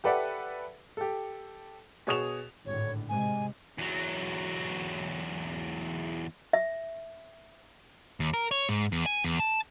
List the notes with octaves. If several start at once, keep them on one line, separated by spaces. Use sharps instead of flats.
G4 A4 B4 D5 E5 F#5
G4 A4
B2 G#4 C#5 D#6 E7 F7
G#1 A2 D3 C#5
C3 G#3 G#5
E2 F#3
E5
D#2
A#4
C#5
G#2
E2
G#5
E2
A5